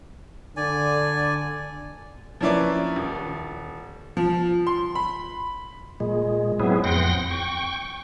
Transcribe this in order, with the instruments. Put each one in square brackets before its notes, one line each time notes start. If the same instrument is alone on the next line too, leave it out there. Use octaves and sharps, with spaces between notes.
[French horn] D3 [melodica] D5 G#5
[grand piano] F3 A#3 C#4 E4 B4 D5
D#1
[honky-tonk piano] F3
C6
B5
[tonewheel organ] A#2 G#3
A2 F#3 B3 C4 E4 G#4
F2 F#5 G5 C6 A#6
G5 C#6